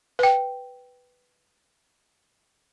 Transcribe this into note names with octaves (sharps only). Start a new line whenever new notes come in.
B4 G5